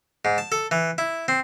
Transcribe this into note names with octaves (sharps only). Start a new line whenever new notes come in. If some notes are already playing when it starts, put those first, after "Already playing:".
G#2
A5
A4
E3
E4
C4